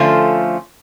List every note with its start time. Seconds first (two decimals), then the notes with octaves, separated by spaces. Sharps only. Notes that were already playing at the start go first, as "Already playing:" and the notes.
Already playing: D3 F3 A3 C#4 F4